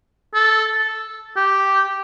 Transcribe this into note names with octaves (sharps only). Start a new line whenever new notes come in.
A4
G4